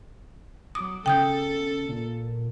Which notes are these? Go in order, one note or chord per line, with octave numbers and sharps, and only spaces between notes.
F#3 D6 D#6
C#3 A4 G5 D#6 G6
A#2